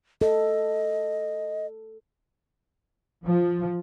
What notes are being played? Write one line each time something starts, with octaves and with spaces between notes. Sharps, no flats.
A4 D#5
F3